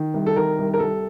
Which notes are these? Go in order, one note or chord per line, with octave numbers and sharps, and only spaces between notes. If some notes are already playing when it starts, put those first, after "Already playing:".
Already playing: D#3
C2
A4
D#3 A#4
C2
A#4
C2 A4